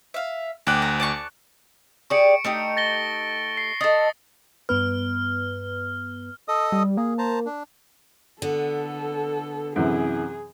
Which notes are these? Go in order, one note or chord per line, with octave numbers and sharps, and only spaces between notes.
E5 F5
D2 G4 D5 F#6
A#5
D5 A5 C#6
G4 G#4 D5 C#6 C#7 D7
A3 D#4 G4
A6 A#6 G7
C7
A4 D#5 D#6 A6
G2 B3 B4 F6
A4 D#5 D#6
G3
A#3 G#4
C5 A5 A#5
D4
D3 B3 A4
F#2 C3 E3 G#4